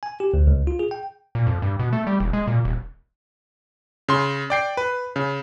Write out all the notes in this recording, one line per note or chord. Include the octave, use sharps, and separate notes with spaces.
G#5
G4
D2
C#2
F4
G#4
G5
A#2
F2
G2
B2
A3
G3
E1
G#3
A#2
D#1
C#3 C6
D5 G5 C7
B4
C#3